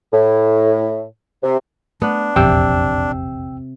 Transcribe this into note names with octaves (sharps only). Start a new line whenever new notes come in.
A2
C3
A3 B3 D4
E1 A#1 F2 C3 G5 E6